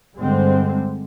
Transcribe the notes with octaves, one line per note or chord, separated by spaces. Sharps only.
G2 D3 G3 G#3 C4